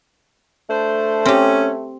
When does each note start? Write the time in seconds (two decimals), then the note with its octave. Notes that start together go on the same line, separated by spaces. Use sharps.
0.70 A3 D4 C5
1.26 C4 C#4 G4